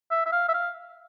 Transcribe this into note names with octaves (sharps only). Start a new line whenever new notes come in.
E5
E5
F5
E5
F5